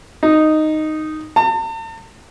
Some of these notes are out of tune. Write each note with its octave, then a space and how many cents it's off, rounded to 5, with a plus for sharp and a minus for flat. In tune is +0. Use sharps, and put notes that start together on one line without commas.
D#4 -5
A5 +45